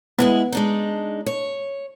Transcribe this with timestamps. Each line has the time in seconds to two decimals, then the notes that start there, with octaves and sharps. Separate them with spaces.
0.19 G#3 B3 E4 G#4
0.52 G#3 D4 D#4
1.26 C#5